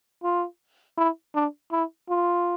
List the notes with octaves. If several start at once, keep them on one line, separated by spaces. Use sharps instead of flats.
F4
E4
D4
E4
F4